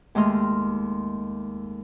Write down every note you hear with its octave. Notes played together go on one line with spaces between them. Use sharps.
D#2 G#3 A3 D#5 C6 F6